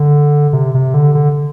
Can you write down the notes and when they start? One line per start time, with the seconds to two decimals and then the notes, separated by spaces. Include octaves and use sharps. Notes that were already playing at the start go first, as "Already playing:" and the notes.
Already playing: D3
0.53 C3
0.75 C3
0.94 D3
1.15 D3